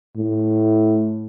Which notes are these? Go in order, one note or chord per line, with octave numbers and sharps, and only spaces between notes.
A2